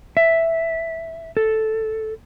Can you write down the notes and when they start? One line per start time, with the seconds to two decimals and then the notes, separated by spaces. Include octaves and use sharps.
0.17 E5
1.37 A4